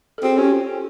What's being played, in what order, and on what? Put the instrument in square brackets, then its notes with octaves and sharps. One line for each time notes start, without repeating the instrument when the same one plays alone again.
[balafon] A4
[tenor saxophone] C4 [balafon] F#4 G#4
[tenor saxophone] C#4 [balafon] F4 G4